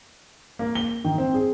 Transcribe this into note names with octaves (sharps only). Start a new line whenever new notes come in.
A#3
G7
D#3
C4
G#4